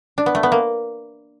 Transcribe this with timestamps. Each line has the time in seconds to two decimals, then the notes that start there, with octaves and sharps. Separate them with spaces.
0.18 D4
0.26 B3
0.35 A3
0.43 B3
0.52 A#3